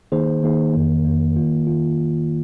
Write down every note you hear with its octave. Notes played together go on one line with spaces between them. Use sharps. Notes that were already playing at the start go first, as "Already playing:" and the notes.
D#3 A#3 D#4 G#4 C5
D#3 A#3 D#4 G#4 C5
F2 D#3 A#3
F2 D#3 A#3
D#3 A#3 F4
D#3 A#3 F4